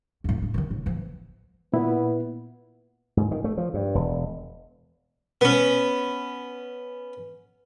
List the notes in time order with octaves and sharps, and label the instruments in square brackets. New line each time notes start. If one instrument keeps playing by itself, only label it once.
[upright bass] F2 A2
D4 F4
D#3 E3
A2
E3 F3
[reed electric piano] A#2 E4 [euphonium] B3
[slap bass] G#2
D#3
A3
F3
G2
E1
[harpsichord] B3 C#4